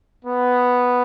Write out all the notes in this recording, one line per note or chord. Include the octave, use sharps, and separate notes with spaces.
B3